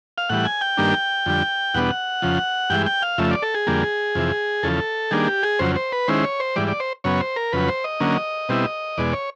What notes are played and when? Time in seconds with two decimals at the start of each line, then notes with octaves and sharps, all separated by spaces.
0.18 F5
0.29 A2 E3 G3 F#5
0.45 G#5
0.61 G5
0.77 G2 D#3 G3 A#3 D4
1.26 F2 D3 G3
1.74 E2 B2 G3 B3 D4 F#5
2.22 F2 C#3 F3
2.70 G2 E3 G#3 G5
2.86 G5
3.02 F5
3.18 F2 C#3 F3 A3 E5
3.31 D5
3.42 A4
3.55 G#4
3.67 F2 D3 G3 A#3
4.15 F2 C3 E3
4.63 E2 C#3 F3 A4
5.11 D#3 G3 A#3 D4 G#4
5.27 G4
5.43 G#4
5.59 F2 C#3 F#3 C5
5.76 C5
5.92 B4
6.08 D#3 G#3 C#4 E4 C5
6.24 C#5
6.40 C5
6.56 G#2 E3 G3 D5
6.68 D5
6.80 C5
7.04 F#2 C#3 F#3 B3 C#5
7.20 C5
7.36 A#4
7.53 F2 C#3 F#3 B4
7.68 C5
7.84 D#5
8.00 D3 F#3 A#3 C#4
8.49 B2 G3 C4 E4
8.98 E2 B2 G#3 D5
9.13 C#5